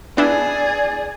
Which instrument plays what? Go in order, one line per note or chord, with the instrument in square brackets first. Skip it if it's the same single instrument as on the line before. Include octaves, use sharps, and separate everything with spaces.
[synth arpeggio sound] B3 D4 E4 [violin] G#4 [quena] D5